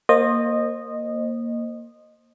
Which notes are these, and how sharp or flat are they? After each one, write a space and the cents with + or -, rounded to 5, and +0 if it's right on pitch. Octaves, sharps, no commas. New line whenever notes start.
A#3 +0 C5 +25 D#5 -15